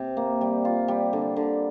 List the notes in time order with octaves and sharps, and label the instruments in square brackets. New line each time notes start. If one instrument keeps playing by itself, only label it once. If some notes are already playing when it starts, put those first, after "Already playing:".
Already playing: [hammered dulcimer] C3
A#3
G3
F4
G3
D3
D3